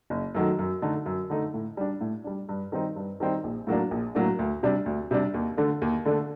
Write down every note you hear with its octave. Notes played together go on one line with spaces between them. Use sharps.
F#1
F#2 D#3 F#3 A3
F#2
D3 A3 D#4
F#2
D3 A3 D#4
A2
G3 D4
A2
G3 D4
G2
D#3 G3 C4 D#4
G2
D#3 G3 C4 D#4
A#1
A2 F#3 A#3 D4
A#1
A2 F#3 A#3 D4
D2
C3 G3 D4
D2
C3 G3 D4
D#2
D3 A3 D4
D#2
D3 A3 D4